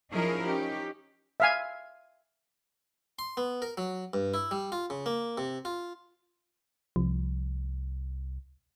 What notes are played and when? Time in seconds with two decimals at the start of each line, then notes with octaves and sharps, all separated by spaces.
0.11 F3 C#4 D#4 E4 G#4 A#4
0.44 C#4 D#4 G4
1.40 E5 F5 G#5
3.19 C6
3.37 B3
3.62 A#4
3.77 F#3
4.14 G2
4.34 E4
4.51 G3
4.72 F4
4.90 C#3
5.06 A#3
5.38 C3
5.65 F4
6.96 C2 F3